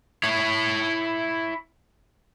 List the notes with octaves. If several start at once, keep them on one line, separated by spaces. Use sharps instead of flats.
E4 C#5